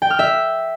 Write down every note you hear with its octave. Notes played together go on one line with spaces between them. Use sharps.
G5
F6
E5